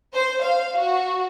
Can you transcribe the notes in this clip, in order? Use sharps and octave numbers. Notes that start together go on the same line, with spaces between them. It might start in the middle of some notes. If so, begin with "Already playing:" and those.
C5
F5
F#4